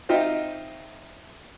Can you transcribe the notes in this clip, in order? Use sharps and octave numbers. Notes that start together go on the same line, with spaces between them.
C4 D#4 F4 D#5 E5 G5